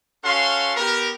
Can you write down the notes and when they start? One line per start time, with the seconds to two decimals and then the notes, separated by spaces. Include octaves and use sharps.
0.23 C#4 F#4 A4 F5 C6
0.76 B3 G4 A#4